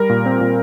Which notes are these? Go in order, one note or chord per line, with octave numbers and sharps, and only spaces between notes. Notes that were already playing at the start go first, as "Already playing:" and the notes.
Already playing: G3 A#4
A#2
C4
A#2